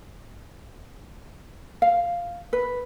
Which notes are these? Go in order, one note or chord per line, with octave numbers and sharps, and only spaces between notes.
F5
B4